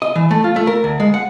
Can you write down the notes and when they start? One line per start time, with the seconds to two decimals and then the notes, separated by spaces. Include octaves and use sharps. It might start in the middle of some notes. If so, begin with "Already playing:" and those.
0.02 D#5
0.16 E3
0.31 A3
0.44 F4
0.56 A3
0.67 A#4
0.84 D2
1.00 G#3
1.14 F#5